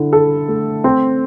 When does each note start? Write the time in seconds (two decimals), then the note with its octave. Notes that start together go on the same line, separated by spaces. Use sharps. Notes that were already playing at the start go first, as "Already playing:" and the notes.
Already playing: D3 E4
0.13 A4
0.48 A3
0.84 C4